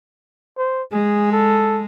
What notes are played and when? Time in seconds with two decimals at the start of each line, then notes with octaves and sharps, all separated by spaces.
0.58 C5
0.92 G#3 G#4
1.32 A4